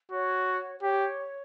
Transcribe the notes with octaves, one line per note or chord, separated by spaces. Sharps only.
F#4 C#5
G4 C#5